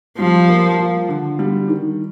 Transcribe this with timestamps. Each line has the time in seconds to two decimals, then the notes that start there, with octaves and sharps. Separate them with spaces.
0.19 F3 G3
0.48 A#3
0.78 F4
1.09 D3
1.39 G3
1.68 D#3